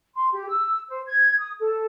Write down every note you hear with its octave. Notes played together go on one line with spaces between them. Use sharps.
C6
G4
E6
C5
G#6
D#6
A4